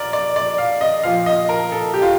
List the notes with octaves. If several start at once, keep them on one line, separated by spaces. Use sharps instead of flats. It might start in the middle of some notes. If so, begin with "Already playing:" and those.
Already playing: A#2 A#4 D5
D5
D5
F5
D#5
A#2 F3 F5
D#5
A#4
A4
G4
F4